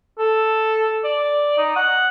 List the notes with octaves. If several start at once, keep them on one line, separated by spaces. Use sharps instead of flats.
A4
D5
D#4
F#5